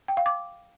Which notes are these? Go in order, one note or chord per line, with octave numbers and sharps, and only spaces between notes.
G5
F5
D6